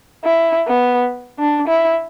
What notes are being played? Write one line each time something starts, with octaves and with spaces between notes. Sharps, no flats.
E4
B3
D4
E4